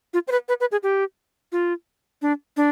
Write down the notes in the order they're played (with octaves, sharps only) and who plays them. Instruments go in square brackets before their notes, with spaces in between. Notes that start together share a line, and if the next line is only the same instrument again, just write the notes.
[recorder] F4
C5
B4
B4
B4
G#4
G4
F4
D4
D4